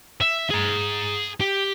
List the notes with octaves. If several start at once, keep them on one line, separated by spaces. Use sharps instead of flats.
E5
G#4 A#5
G4